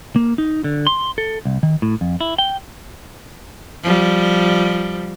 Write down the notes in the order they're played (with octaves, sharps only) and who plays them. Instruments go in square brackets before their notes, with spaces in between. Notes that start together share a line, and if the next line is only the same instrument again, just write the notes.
[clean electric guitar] A#3
D#4
D3
C6
A4
C2
D#3
A2
F2
E4
G5
[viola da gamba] F3 G3